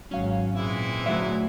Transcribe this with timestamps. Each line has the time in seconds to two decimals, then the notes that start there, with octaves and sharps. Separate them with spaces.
0.11 G#1 F#3 C#4 F5
0.55 A#2 E3 G#3 C4 E4
1.06 D2 F#3 E5